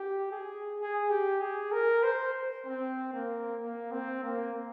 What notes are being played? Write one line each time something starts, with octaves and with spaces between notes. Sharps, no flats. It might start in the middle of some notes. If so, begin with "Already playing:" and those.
Already playing: G4
G#4
G#4
G4
G#4
A#4
C5
C4
A#3
A#3
C4
A#3